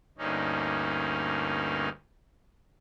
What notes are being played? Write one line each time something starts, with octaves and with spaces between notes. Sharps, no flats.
D2 G2 A#3 C#4 D#4